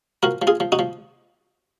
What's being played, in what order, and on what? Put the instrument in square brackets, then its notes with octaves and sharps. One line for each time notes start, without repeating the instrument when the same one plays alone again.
[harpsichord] F3 F#4 A#4
F3
F4 G#4
F3
D#4 F#4
F3